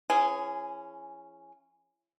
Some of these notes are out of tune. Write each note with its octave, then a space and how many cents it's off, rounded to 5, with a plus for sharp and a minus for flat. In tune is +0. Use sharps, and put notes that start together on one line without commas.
E3 +40 C#4 -5 G#4 +0